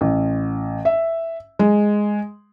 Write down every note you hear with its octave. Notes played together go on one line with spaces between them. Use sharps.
A1
E5
G#3